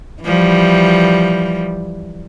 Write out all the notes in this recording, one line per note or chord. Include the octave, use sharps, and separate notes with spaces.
E3 F3 G3